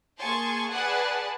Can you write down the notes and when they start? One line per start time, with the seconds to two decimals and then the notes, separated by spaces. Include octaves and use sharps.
0.18 A#3 G#4 G#5 A5 C6 C#6
0.71 G#4 B4 D5 F#5 G#5 A5